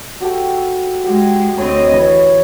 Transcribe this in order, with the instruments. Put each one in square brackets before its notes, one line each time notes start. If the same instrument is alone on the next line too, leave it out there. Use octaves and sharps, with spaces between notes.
[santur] F#4 G4 A4
[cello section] G#3 [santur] F#4 G4
[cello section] D2 C4 D#5 [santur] C#5 B5
[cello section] E3 [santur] B4 C#5